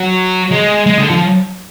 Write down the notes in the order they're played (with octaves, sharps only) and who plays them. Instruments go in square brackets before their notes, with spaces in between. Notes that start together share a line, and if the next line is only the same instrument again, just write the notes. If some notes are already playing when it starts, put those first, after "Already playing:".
Already playing: [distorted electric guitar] F#3
G#3
G#3
D3
F3